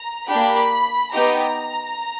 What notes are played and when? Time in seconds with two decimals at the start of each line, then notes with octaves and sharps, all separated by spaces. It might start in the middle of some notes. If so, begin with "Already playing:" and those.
Already playing: A#5
0.28 A#3 D4 G4 B5
1.12 B3 D#4 G4 A#5